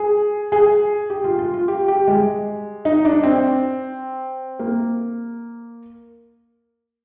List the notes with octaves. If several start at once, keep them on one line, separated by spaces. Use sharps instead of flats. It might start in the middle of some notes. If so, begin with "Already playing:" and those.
Already playing: G#4
G#4
G4
F4
F4
F4
G4
G4
G#3
D#4
D4
C4
A#3